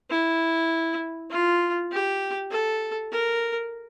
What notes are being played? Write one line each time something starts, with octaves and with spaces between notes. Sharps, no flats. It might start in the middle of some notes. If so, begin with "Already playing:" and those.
E4
F4
G4
A4
A#4